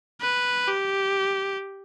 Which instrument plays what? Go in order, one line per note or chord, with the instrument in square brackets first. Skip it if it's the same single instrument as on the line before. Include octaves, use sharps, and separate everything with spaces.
[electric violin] B4
G4